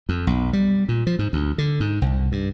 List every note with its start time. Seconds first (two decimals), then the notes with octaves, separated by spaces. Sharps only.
0.09 F2
0.27 B1
0.53 G3
0.89 A#2
1.07 F3
1.19 G#2
1.33 D2
1.58 D3
1.80 G#2
2.02 C2
2.32 G2